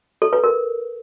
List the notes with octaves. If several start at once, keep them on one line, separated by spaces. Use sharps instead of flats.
A4
B4
A#4